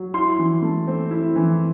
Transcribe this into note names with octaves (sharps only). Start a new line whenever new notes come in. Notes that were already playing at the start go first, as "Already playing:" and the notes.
Already playing: F#3
E4 C6
E3
A3
C4
E4
E3